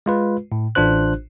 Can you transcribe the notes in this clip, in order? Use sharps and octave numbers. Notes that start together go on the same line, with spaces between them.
G#3 F4 B4
A2
A1 D4 F4 C5 F#6